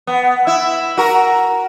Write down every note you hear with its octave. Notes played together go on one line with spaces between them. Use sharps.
B3
E4
F#4 A#4